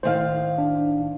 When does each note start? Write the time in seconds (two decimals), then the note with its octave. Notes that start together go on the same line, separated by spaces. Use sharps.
0.03 A2 D#3 C5 F5
0.58 D4